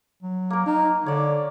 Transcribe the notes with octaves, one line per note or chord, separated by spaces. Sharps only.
F#3
A#3 A#4
D#4
D3 C#5 D5